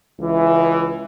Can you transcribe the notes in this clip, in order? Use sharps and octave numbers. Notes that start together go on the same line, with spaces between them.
C#2 E3